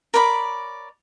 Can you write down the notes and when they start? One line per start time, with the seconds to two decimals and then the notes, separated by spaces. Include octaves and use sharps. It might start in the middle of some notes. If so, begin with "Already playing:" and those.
0.14 A#4 C#5 D5 B5